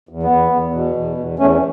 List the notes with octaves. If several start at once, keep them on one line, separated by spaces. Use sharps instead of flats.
E2
B3
E2
E2
B2
E2
E2
E2 A3 C#4